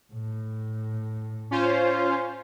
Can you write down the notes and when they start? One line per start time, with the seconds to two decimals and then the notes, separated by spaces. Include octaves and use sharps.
0.13 A2
1.51 C#4 F4 C5